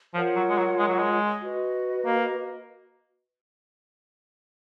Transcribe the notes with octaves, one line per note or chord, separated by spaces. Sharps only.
F3 F4 A#4 C#5 F#5
F#3
G#3
F#3
G#3
F#3
G#3
F#4 B4 D#5
A#3